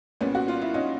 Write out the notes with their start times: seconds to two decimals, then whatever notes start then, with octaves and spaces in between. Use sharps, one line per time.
0.21 C2 A#2 G3 B3 C#4
0.35 F#4
0.48 F4
0.62 E4
0.74 C#4 D#4